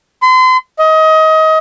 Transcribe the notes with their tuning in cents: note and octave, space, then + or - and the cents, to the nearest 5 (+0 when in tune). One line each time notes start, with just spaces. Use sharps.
C6 -35
D#5 +25